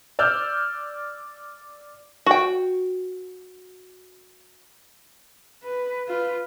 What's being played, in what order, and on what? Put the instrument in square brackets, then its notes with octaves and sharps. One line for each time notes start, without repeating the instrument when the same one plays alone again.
[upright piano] D5 E6 F6 G6
[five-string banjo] F#4 G5
[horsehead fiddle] B4
F4 B4